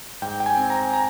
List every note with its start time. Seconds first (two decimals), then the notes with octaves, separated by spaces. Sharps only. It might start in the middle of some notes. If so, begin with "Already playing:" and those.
0.22 G#2 G5
0.40 G5
0.46 G#5
0.57 C4
0.70 A#5
0.94 A#5